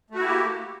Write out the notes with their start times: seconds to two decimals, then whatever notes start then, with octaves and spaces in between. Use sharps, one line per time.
0.10 A3
0.15 F#4
0.19 E4
0.24 G4
0.29 A#3